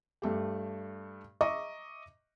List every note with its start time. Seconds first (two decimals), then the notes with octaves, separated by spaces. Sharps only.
0.22 G2 A3 G4
1.41 D#5 E5 A#5 C#6 D6